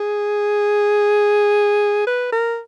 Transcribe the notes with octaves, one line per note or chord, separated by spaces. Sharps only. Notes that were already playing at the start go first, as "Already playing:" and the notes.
Already playing: G#4
B4
A#4